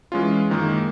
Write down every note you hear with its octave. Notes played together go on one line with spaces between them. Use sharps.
E3 G#3 C#4 F4
F#2 D#3 G#3 A#3